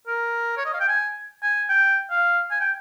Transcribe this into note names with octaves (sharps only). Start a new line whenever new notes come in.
A#4
C#5
D#5
F5
G5
G#5
G#5
G5
F5
G#5
G5